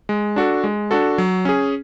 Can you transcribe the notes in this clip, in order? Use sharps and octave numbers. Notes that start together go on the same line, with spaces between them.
G#3
D4 F#4 A4
G#3
D4 F#4 A4
F#3
C#4 G#4